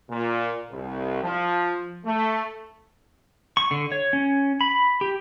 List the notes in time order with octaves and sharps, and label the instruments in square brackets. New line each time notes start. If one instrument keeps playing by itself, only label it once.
[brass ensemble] A#2
C2
F3
A3
[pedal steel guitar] C#6
D3
C#5
C#4
B5
G4